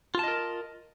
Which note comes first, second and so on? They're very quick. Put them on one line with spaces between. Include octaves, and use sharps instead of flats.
F4 A5 D#5 A#4